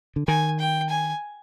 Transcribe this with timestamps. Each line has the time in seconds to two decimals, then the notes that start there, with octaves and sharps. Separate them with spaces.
0.16 D3
0.27 D#3 G#5
0.60 G5
0.90 G#5